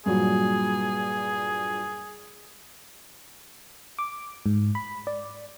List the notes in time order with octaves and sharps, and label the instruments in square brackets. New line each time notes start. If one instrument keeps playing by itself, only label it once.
[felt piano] G2 A#2 F#3 [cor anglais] G#4
[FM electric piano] D6
G#2
B5
D5